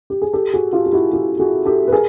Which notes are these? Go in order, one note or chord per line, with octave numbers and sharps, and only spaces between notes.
G4
G#4
G4 A4
F#4 G#4
F4 G4
G4
E4 F#4
F4 G4
F#4 G#4
G4 A4
B4
G#4 A#4